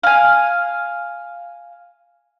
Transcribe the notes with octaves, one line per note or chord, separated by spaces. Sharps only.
F5 G#5